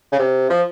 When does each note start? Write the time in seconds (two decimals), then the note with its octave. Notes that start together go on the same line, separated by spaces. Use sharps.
0.12 C#3
0.19 C3
0.50 F3